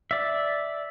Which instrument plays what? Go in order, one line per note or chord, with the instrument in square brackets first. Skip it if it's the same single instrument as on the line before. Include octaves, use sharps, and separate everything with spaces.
[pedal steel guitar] D5 E5